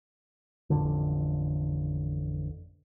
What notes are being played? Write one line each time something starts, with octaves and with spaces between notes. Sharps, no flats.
A1 F2 D3